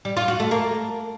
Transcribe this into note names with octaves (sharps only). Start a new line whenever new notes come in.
G3
F4
F#4
A3
A#3